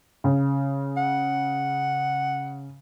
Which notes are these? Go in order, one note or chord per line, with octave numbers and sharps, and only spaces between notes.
C#3
F#5